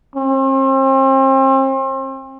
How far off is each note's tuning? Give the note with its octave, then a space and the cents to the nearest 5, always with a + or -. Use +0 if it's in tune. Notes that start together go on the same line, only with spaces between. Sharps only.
C4 +40